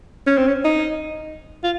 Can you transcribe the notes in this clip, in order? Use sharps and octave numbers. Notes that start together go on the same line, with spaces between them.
C#4
C4
C#4
D#4
F4